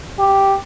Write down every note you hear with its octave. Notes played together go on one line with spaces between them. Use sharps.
G4